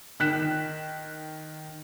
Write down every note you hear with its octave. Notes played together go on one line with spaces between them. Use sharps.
D#3 F#6 B6 E7